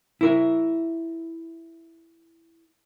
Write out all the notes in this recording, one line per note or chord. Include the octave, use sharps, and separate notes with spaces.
E4 A#4 E5